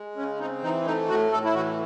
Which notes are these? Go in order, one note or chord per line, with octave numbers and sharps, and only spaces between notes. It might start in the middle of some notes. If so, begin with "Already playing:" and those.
Already playing: G#3
C#3 C#4
C4 D#4
E3 D#4
A3 D#4
A2 F#4
A2 A4
E4
E3 F#4